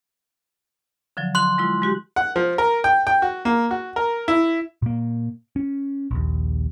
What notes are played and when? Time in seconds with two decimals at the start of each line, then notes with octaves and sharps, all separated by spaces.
1.17 D3 F3 F#3
1.35 C6 F#6 F#7
1.58 G#3 E4 F4
1.82 G#3 F#4 G4
2.16 F#5
2.36 F3
2.58 A#4
2.84 G5
3.07 G5
3.22 F#4
3.45 A#3
3.71 F#4
3.96 A#4
4.28 E4
4.82 A#2 A#3
5.56 C#4
6.11 A#1 D#2